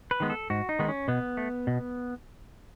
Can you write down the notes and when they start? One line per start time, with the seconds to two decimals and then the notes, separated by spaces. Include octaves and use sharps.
0.11 B4
0.20 D#3 G#3 B3
0.30 A4
0.50 G#2 F#4
0.69 D#4
0.79 D#3 G#3 B3
0.88 C#4
1.08 B2 B3
1.37 A3
1.67 B2